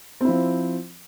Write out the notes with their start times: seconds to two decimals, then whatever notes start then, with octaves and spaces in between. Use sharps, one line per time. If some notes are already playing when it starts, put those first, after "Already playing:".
0.21 C4
0.25 E4
0.29 F3